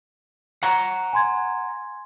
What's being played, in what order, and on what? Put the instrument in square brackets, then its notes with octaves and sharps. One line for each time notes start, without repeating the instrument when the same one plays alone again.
[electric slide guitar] F#5 A#5 [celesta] C#6
[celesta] G#5 C6 G#6